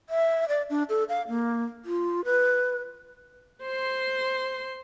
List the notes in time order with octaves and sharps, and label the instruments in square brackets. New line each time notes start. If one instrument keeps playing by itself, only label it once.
[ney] E5
D5
D4
A4
F5
A#3
F4
B4
[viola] C5 C6